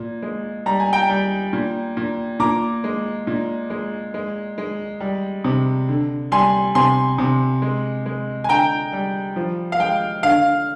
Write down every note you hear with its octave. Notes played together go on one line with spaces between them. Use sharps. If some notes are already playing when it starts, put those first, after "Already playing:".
Already playing: A#2
G#3
G3 A#5
G#5
G5 A#5
G3
A#2
A#2
A#2 A#5 D6
G#3
A#2
G#3
G#3
G#3
G3
C3
D3
G3 G#5 C6
C3 G#5 C6
C3
G#3
G#3
G#5
D3 G5 A#5
G3
F3
F5
G#3 G5
D3 F5